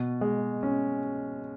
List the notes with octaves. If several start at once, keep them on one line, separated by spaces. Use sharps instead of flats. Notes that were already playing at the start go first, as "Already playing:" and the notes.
Already playing: B2
G#3
C#4